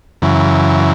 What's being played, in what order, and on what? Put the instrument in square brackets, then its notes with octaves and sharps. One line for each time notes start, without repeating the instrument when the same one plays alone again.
[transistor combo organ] F#2 C#3 E3